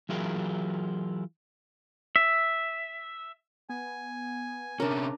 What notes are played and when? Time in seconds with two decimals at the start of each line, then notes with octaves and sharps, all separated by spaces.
0.09 E3 F#3 E4 F4 G#4 A#4
2.16 E5
3.69 B3 G#5
4.80 C3 C#4 D4 A#4